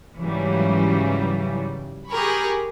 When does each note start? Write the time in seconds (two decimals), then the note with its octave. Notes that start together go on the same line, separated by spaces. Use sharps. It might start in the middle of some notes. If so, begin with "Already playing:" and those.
0.20 G#2 C#3 E3 F#3 G3
2.09 G4 G#4 A#4 B5 C#6